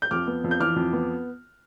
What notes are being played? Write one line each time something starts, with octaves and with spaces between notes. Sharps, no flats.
G6
F2 D6 F6
B3
F2
G6
E3 D6 F6
F2
B3